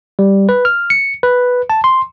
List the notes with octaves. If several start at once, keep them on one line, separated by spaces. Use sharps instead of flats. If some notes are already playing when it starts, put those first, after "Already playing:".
G3
B4
F6
C#7
B4
A5
C6